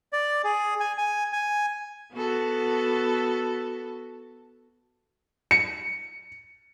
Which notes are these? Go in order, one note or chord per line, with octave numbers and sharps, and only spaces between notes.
D5
G#4
G#5
G#5
G#5
B3 F#4 A4
C#7